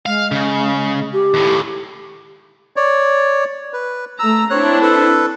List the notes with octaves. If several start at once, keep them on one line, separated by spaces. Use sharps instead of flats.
G#3 F5
C#3
G4
D#2 A2
C#5 D5
B4
A3 A#5 E6
C4 D4 E4 C#5 F#6
A4 B4